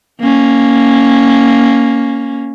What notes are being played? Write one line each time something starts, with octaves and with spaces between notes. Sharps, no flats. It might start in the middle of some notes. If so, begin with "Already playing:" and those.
A#3 C#4